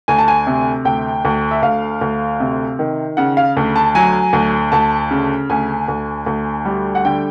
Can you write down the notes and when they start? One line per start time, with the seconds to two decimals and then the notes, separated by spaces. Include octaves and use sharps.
0.08 D2 G#5
0.18 A5
0.28 G#5
0.47 C3
0.85 D2 G5
1.25 D2
1.51 E5
1.62 D2 F5
2.01 D2
2.40 C3
2.79 D#3
3.17 C#3 F#5
3.37 F5
3.57 D2
3.76 A5
3.95 F#3 G#5
4.33 D2
4.72 D2 A5
5.11 C#3
5.50 D2 G#5
5.88 D2
6.26 D2
6.65 G3
6.95 F#5
7.05 D3 G5